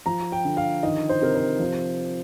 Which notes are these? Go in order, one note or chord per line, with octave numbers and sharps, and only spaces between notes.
F3 A#5
G5
D3
F5
D#3 D#5
C5
C3 A#4
C5
F3